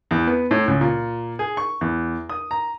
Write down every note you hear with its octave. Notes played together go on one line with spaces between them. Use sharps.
E2
B3
A2
C#2
A#2
G#4
C#6
E2
D#6
A#5